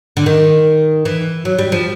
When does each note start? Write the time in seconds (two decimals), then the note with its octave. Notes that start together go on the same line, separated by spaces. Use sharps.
0.17 D3
0.26 D#3
1.05 E3
1.45 F#3
1.58 G3
1.72 F3